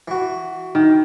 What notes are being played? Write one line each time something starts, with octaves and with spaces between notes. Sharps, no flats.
E3 F#4
D#3